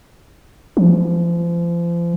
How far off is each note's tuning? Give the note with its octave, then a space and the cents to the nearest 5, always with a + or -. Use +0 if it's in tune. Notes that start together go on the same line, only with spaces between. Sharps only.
F3 -35